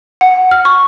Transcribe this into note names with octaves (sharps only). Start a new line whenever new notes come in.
F#5
F6
C#6